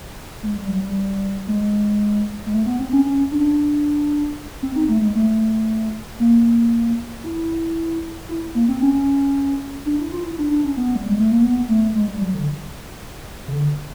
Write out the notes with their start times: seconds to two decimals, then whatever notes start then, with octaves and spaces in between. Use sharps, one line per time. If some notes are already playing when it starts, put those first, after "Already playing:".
0.43 G#3
0.56 G3
0.68 F#3
0.79 G3
1.48 G#3
2.46 G#3
2.53 A3
2.66 B3
2.80 C4
2.92 C#4
3.06 C#4
3.32 D4
4.63 C4
4.76 D#4
4.89 A3
5.01 G#3
5.15 A3
6.19 A#3
7.24 E4
8.29 E4
8.55 A#3
8.68 C4
8.82 C#4
9.86 D4
9.99 E4
10.12 F4
10.25 E4
10.39 D4
10.51 D4
10.64 C#4
10.77 B3
10.96 G3
11.07 G#3
11.20 A3
11.31 A#3
11.43 B3
11.69 A3
11.95 G#3
12.08 G3
12.21 F#3
12.34 D3
13.48 C#3
13.53 D3